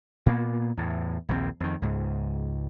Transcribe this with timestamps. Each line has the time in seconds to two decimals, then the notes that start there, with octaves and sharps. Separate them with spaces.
0.26 A#2 A#3 B3
0.77 E2 A2
1.29 A#1 D#2 D#3 C4
1.60 F2 D#3
1.82 C#2 G#2